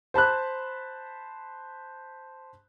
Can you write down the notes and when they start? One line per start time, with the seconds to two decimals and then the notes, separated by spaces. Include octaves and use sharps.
0.14 C5 A5 B5 F#6